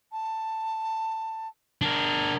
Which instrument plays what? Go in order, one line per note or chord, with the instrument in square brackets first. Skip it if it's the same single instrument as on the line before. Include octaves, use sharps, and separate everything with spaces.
[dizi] A5
[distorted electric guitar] D4 A#4